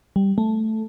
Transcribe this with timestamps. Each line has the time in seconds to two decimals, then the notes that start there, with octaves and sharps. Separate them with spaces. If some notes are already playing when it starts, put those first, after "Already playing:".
0.16 G3
0.38 A3